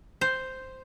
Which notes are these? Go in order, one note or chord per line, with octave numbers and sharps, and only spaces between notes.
C5